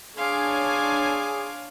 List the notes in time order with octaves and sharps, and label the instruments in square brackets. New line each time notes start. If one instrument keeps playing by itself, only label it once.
[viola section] D4 C#5 G#5 [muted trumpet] G#4 [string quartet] F5 C6 D6